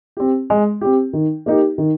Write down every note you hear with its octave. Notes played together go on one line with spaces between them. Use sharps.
C4 G4
G#3
C4 G4
D#3
A#3 D#4 G4
D#3